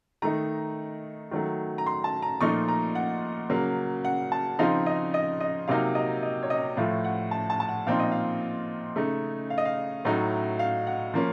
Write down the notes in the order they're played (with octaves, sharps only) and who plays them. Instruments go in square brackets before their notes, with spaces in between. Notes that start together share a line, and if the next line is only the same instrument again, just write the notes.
[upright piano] D#3 A3 D#4 A#5
D#3 F#3 A3
A#5
C6
A5
A#5
A#2 F3 A3 D#4 C#6
A#5
F#5
C#3 F#3 A#3
F#5
A5
C#3 F3 C4 D#4 F5
D#5
D#5
D#5
C3 F#3 A#3 D#4 F5
D#5
D#5
C#5
D#5
A2 F3 A3 F5
F#5
A5
A5
A5
F#5
A#2 F3 C4 D#4 F5
D#5
F5
C#3 A3 D#4
F5
D#5
F5
A2 F#3 A3 D#4
F5
F#5
F3 A#3 C#4